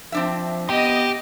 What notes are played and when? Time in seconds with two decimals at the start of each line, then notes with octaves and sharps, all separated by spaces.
0.12 F3 C4 D4 E5
0.70 B3 G4 D#5